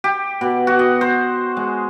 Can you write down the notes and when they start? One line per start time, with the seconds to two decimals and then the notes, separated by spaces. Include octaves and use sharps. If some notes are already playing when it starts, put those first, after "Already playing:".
0.04 G4
0.41 B2
0.67 F#4
0.79 D#5
1.01 C5
1.57 G#3